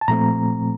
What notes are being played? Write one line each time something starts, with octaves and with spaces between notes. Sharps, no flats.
A5
A#2 F3 A3 C4 A#5